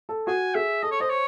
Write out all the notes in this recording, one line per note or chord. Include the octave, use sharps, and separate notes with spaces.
A4
F#4 G#5
G#4 E5
A4 D#5
C#5
C5 D#5
C#5